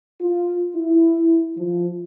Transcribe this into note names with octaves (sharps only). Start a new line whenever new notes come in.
F4
E4
F3